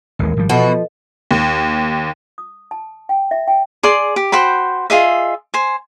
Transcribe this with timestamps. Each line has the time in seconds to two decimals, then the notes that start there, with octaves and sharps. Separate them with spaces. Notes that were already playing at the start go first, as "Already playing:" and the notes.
0.19 A1 D#2 G#3 A#4
0.37 G#1 F3 G3
0.49 B2 E3 F3 F#4 A4 B4 D#5
1.31 D#2
2.38 D#6
2.71 A5
3.09 G5
3.31 E5
3.47 G5
3.83 G#4 D5 C6
4.16 G4
4.32 F#4 C5 G5 B5
4.90 F4 G#4 D#5 E5
5.54 C5 G#5